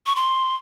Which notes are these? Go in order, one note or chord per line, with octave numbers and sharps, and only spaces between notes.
C#6
C6